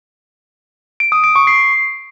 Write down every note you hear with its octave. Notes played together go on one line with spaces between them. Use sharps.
D7
D#6
D7
C#6
C7